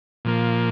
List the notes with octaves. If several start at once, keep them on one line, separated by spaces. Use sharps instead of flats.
A#2 F3 A#3